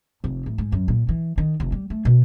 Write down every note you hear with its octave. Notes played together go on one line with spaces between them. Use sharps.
F1
A1
G#2
F#2
A#2
E3
D#3
F1
G3
A3
B2